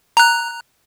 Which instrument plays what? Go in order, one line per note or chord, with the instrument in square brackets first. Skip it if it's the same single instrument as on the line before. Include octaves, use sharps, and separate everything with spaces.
[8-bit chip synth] A#5 F#6